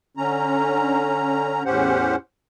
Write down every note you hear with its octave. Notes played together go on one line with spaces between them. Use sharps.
D3 C#4 A#5
E2 A2 C#4 G4 C5 F#5